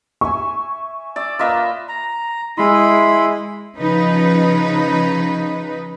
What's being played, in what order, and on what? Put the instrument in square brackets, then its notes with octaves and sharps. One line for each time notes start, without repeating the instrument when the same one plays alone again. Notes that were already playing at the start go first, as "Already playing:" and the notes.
[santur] E5 G#5 [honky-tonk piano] C#6
[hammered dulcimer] D5 E5
[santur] A#3 A#4 B4 [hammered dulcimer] F4 D#5 E5
[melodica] A#5
[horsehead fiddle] G#3 [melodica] E4 B5 C6
[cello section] C#3 F3 D#4 B4